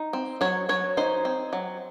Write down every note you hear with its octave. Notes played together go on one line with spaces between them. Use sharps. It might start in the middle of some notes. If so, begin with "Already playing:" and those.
Already playing: D#4
C4
F#3 C#5
F#3 C#5
D#4 C5
C4
F#3